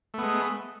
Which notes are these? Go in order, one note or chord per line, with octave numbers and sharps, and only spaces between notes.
G#3 A3 B3